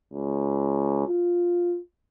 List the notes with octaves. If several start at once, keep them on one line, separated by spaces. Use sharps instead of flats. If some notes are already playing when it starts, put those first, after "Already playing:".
C#2
F4